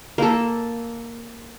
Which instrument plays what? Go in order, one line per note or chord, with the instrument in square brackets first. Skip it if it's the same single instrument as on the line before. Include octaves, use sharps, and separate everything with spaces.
[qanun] A#3 A4